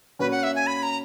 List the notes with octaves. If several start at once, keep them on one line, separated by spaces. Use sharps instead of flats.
A#2 A#3 C#4 F#4 B4
F#5
E5
G#5
B5
A#5